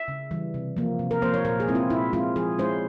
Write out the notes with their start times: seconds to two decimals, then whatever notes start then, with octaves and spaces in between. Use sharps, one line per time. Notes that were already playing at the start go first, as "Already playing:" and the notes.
Already playing: E5
0.08 C#3
0.31 E3 G3
0.54 C3
0.77 F3 A#3
0.99 C3
1.11 A#4
1.22 A#3 C5
1.25 F3
1.34 C#5
1.45 A#2 A#4
1.60 G#4
1.68 G#3 C4 E4
1.75 F4
1.90 A#2 E4
2.13 G#3 C4 E4 F4
2.36 F3 G#4
2.59 G#3 C#4 E4 C5